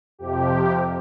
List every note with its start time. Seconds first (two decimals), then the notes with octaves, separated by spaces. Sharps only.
0.19 F2 C3 F3 G4